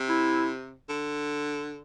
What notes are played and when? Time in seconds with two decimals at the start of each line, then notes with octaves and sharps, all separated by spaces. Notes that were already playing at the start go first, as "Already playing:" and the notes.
Already playing: C3
0.09 E4
0.89 D3